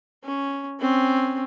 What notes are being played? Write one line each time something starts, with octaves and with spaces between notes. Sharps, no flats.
C#4
C4 C#4